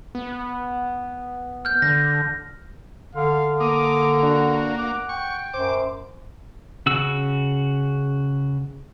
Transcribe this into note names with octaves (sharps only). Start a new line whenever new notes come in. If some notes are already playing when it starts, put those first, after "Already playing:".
B3
F6 G6
D3 A#6
D3 F5
A#3 D6 D#6
D4 F#4
F#5 D6
G5 C#6
F#2 C5 D6
C#3 F#4 E6